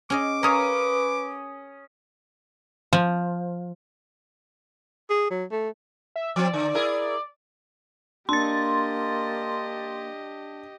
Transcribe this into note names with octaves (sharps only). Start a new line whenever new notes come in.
C#4 G#4 D#5 D6
C#4 A#4 B4 C#5 F5 D#6
F3
G#4
F#3
A3
E5
F3 C4 D5
D3
E4 G#4 A#4
A#3 D4 G4 D#5 C6 A6